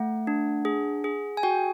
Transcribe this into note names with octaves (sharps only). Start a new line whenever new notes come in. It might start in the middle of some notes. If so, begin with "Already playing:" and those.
Already playing: A3 F#5
D4
G#4
G#4
G#5
F#4 G5